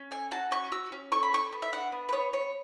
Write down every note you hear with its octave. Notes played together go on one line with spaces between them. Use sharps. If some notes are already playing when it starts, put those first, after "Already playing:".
Already playing: C#4
A4 G#5
F#4 A5
C#4 C#6
F#4 E6
C#4
A4 C#6
B5
A4 C#6
B3
E5
D4 F#5
B3
B4
B3 C#5
B3 C#5